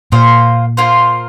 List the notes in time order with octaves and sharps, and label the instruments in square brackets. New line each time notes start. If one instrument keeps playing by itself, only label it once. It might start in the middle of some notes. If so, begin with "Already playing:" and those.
[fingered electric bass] A#2 [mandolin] A#3 F4 C5 F5
[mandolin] A#3 F4 C5 F5